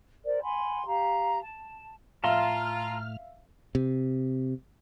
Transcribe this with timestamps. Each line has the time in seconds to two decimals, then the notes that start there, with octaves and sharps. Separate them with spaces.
0.24 A#4 C5 D5
0.41 F#5 G#5 B5 C6
0.85 G4 F5 A#5
1.40 A5
2.24 A2 F4 E5 F5 A5 A#5 C6 F6
3.75 C3